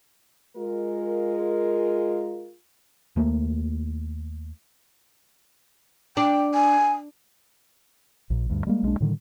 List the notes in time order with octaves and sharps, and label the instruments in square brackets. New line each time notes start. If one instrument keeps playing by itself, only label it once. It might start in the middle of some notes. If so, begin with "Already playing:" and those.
[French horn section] G#3 F4 A#4
[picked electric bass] D#2 A3 A#3
[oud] D4 [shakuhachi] G5
[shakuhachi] G#5
[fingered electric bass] A#1 A#2
D2 G2
G3 G#3 A#3
B1 G#3 A#3 D4
A2 D3 D#3 G3